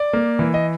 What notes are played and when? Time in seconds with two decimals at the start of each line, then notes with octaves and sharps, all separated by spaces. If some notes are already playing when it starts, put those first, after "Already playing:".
Already playing: D5
0.13 A#3
0.39 E3
0.54 D#5